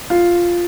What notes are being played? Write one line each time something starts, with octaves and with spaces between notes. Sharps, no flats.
F4